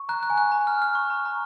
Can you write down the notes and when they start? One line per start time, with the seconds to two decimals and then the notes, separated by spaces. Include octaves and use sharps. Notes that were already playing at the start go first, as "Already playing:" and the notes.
Already playing: C#6
0.09 A#5 F#6
0.23 F#6
0.30 G#5
0.38 F#6
0.52 A#5
0.67 F6
0.82 F6
0.95 C#6
1.10 A#5
1.25 A#5